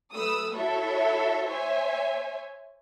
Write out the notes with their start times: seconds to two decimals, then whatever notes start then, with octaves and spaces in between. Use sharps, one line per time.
0.15 F#3 A3 B4 D#6 E6
0.55 E4 F#4 A4 C#5 E5
1.46 C5 C#5 E5 G#5